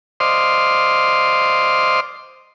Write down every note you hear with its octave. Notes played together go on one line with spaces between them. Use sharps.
C5 D5 D#5 F5 C6